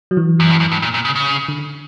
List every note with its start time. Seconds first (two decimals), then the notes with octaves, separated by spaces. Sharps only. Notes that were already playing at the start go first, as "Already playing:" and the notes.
0.11 F#3
0.17 E3
0.40 F#2
0.50 G2
0.60 F#2
0.72 G2
0.82 A#2
0.94 A#2
1.05 C#3
1.16 C#3
1.48 D3